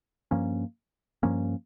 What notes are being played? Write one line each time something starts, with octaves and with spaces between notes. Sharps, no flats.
G2 F3 A#3 C#4
G2 F3 A#3 C#4